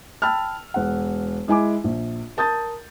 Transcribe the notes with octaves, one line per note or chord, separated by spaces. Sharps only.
G5 A5 B5 E6 F6
E1 F#5
G#3 E4 G#5 D6
A#1
A#4 A5 D#6 G6 A6